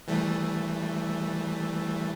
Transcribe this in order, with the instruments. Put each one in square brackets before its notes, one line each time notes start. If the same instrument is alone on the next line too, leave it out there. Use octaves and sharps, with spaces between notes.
[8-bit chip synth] E3 G3 A3